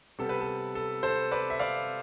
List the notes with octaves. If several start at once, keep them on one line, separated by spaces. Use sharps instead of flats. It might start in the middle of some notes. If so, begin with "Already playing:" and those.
C3 G3 B3 A4
B4
A4
A4
A4 C5
B4 D5
E5
D5 F5